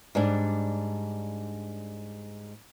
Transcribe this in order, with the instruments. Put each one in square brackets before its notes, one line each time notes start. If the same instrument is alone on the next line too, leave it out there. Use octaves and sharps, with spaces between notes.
[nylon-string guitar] G#2 G3 D4